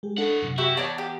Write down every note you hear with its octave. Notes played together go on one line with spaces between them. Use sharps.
G#3 G4
A2 D4 A4 F#5
F#2 C3
E4 F#4 G4 E5
E2 C#5 D5 A5 G6
G4